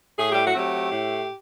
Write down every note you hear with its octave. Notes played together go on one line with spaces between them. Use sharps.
A2 G#4
G4
F#4
F#3 A3 C4 G4
A2